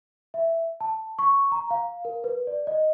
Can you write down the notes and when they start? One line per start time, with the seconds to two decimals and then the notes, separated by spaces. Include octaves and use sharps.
0.34 E5
0.80 A5
1.19 C#6
1.52 A#5
1.71 F5
2.05 A#4
2.24 B4
2.47 D5
2.67 D#5